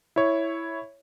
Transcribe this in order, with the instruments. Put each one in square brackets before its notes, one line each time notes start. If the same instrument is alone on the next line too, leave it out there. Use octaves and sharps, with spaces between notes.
[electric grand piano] E4 C#5